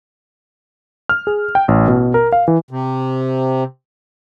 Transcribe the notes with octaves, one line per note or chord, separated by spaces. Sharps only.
F6
G#4
G5
A1
B2
A#4
F5
E3
C3